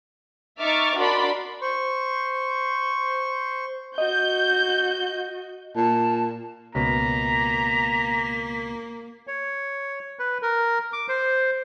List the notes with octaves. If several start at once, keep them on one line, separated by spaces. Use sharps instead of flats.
D#4 E5 C#6 D6 F6 A6
D4 F#4 A#4 D5 B5 C6
C5 C#6
F#4 D#5 G6
A#2 A5
C#2 B2 A#3 A#5 B6
C#5
B4
A#4
D6
C5